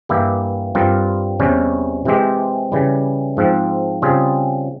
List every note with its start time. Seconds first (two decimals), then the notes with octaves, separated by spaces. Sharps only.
0.09 G2 E3 A#3 E4 G4
0.75 G2 G3 C4 F4 A#4
1.40 E2 C3 G3 C#4
2.05 C3 E3 G#3 C4 G4
2.72 C#3 E3 G3
3.37 G#2 F3 C4
4.02 C#3 G3 C4 F4 G#4